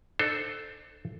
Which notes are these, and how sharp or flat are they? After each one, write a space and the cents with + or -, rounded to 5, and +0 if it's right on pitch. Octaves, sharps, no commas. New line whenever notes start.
D4 +40 A4 +0 C5 +0